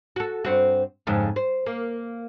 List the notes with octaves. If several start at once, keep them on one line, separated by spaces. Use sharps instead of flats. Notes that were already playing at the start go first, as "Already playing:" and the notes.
F#4 A4
G2 C4 F#4
F2 G#2 C#3
C5
A#3